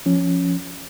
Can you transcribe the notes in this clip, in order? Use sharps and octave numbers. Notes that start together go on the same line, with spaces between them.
F3 C#4